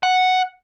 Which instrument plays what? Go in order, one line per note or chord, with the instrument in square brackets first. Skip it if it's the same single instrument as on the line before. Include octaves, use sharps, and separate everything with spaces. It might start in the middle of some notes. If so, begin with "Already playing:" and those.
[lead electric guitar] F#5